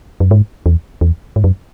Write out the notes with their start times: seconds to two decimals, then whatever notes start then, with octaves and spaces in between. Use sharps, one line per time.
0.20 F#2
0.31 G#2
0.66 E2
1.01 E2
1.36 G#2
1.44 F#2